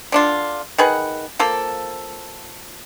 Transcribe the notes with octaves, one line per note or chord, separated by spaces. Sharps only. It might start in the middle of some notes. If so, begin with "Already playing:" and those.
D3 D4 F4
D#3 G#4 B4 F#5
F3 A#3 A4